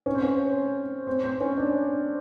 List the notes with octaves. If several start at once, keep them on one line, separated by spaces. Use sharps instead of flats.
C#4
C4
C#4
C4
C4
C#4
D4